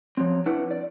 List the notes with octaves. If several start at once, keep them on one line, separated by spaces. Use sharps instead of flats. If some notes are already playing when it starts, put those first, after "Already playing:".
F3 F#3 C4
D4 E4 B4 F#5
D5